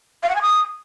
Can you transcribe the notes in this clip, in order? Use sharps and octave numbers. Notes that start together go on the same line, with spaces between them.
F5
F#5
G#5
D#6